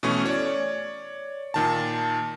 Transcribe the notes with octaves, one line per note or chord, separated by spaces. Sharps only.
B2 E3 A3 C#4 C#6
C#5 D5
A#2 D#3 A5